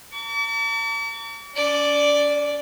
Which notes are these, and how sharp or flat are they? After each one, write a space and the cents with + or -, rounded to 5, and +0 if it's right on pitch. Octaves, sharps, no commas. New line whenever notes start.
A#5 -45 D6 -45
C#4 +45 D5 +0